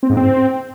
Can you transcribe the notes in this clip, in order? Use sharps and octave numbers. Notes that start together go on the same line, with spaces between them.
C4
G#2
C4